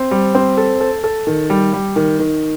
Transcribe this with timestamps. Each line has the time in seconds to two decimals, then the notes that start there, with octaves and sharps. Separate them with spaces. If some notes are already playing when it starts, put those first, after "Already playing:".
Already playing: C4
0.11 G3
0.35 C4
0.57 A4
0.80 A4
1.04 A4
1.27 D#3
1.50 G3
1.73 G3
1.96 D#3
2.19 D#3